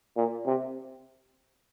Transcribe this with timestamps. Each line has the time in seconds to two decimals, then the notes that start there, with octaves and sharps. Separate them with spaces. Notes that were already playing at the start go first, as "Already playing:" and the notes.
0.16 A#2
0.46 C3